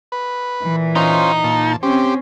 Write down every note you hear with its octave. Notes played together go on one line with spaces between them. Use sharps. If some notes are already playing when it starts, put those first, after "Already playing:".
B4
A#2 E3
C#4 D#4 F4 C5
A#2 A5
C4 C#4 G4 C5